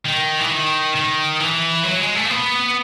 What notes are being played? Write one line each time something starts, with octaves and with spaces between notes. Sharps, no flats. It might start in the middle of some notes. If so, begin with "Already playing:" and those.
D#3
E3
D#3
D#3
E3
F#3
G#3
A3
A#3
B3